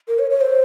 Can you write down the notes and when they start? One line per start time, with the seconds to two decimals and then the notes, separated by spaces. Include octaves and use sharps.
0.08 A#4
0.19 C#5
0.30 C#5
0.41 C5